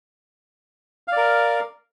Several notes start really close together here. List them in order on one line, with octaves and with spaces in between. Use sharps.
F5 D5 A#4